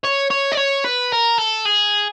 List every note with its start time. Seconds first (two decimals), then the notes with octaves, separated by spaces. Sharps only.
0.05 C#5
0.31 C#5
0.52 D5
0.57 C#5
0.84 B4
1.12 A#4
1.38 A4
1.65 G#4